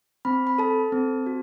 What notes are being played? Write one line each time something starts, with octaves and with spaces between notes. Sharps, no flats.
C4 B5
B5
A4 A5
C4
F#4